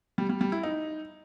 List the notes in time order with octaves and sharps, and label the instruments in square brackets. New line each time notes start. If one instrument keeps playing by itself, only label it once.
[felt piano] G3
G3
G3
E4
D#4